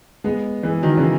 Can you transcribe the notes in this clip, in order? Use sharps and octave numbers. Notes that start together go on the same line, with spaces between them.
G#3 B3
E3 G#3
D#3 F#3
C#3 E3